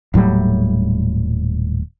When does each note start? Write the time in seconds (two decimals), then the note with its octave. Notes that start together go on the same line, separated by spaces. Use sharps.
0.14 D#1 A2 F#3 G3